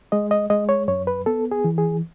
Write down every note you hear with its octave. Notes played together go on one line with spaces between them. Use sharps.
G#3 D#5
D#5
G#3 D#5
C#5
F#2 C#5
B4
B3 A4
G#4
E3
G#4